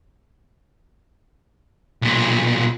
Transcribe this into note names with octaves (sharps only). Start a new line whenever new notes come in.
B1 A#2